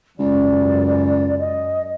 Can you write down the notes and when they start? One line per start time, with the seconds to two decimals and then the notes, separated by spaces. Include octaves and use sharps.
0.19 C#2 F#2 D5
1.39 D#5